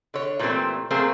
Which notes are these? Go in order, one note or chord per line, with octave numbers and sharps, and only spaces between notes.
D3 C#5
A#2 D#3 E3 G3 A3 C4
F#3 A3 A#3 C4 G#4